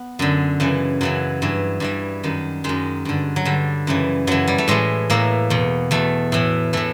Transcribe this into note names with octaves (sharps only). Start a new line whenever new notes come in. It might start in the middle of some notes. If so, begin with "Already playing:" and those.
Already playing: B3
F#2 D3
F#2 C#3 E3
F#2 C#3 E3 F#3
G2 E3
G2 E3 G3
F#2 D#3
F#2 D#3 G#3
G2 D3
F#3
G2 D3 G3
F#2 C#3 E3
F#2 C#3 E3 F#3
G3
A3
A2 E3 G#3
A2 E3 A#3
E2 B2
E2 B2 A3
A2 E3
A2 E3 A3